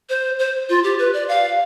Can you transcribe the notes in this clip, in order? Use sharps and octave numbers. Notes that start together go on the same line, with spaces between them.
C5
C5
F4
G4
B4
D5
F5